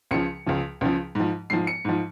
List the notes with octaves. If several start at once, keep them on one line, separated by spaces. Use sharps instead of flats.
C#2 C#3 F3 C#7
C#2 C#3 F3
C#2 C#3 F3
G#2 F3
G#2 F3 C7
C#7
G#2 F3